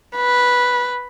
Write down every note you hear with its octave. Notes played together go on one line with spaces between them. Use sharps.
B4